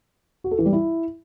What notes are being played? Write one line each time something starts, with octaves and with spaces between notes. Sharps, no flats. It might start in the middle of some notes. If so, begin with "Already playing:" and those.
F#4
A4
E3
G3
E4